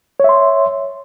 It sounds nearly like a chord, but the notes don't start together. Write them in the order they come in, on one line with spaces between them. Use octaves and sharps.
C#5 E5 C6